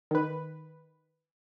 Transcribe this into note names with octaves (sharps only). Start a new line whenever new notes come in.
D#3 B4